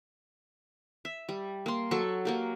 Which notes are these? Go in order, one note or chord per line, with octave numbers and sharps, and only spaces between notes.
E5
G3
A#3 C6
F#3 A4 C#6
F#3 A#3 G4